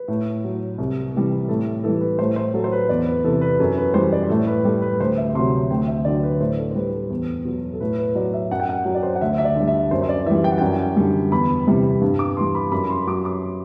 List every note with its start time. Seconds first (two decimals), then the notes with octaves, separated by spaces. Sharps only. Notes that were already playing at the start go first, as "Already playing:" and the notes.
Already playing: B4
0.08 A2
0.44 F#3
0.78 C2
1.14 C3 E3 G3
1.48 A2 A4
1.84 E3 G3 A4
2.01 B4
2.19 A2 C5
2.36 C5
2.54 F#3 A4
2.64 C5
2.72 B4
2.89 E2 D5
3.06 B4
3.24 C3 E3 A4
3.41 B4
3.60 F#2 A4
3.78 B4
3.94 E3 G3 C5
4.13 D5
4.29 A2 A4
4.47 B4
4.65 G3 A4
4.82 B4
5.00 D2 C5
5.17 E5
5.35 C3 F#3 C6
5.71 D2 G5
5.87 E5
6.05 D3 F#3 D5
6.23 B4
6.40 A2 C5
6.58 A4
6.71 C5
6.75 G3 B4
6.93 A4
7.10 E2
7.45 B2 F#3
7.73 A4
7.81 A2 B4
7.98 B4
8.15 F#3 D5
8.34 E5
8.51 F#2 F#5
8.60 G5
8.69 F#5
8.85 F#3
8.95 D5
9.03 C5
9.15 F#5
9.21 D2 E5
9.38 E5
9.45 D5
9.56 D3 G3
9.67 E5
9.91 F#2 C5
10.02 C5
10.09 D5
10.26 E3 G3 E5
10.44 G5
10.51 F#5
10.58 F#2 G5
10.96 D3 G3
11.32 E2 B5
11.67 C3 E3 G3
12.01 G2
12.19 D6
12.37 E3 G3 C6
12.55 B5
12.72 F#2 B5
12.90 C6
13.07 F#3 D6
13.25 D6